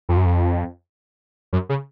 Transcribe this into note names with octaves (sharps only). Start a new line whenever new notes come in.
F2
F#2
F2
F#2
C#3